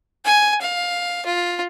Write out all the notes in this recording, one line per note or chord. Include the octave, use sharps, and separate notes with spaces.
G#5
F5
F4